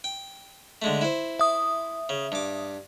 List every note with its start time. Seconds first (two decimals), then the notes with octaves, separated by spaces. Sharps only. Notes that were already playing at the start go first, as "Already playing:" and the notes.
0.04 G5
0.82 D3 G#3 A3
1.01 E4 C5
1.39 E5 D#6
2.09 C#3
2.32 G2 D6